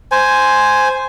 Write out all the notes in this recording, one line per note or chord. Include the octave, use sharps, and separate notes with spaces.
C5 G#5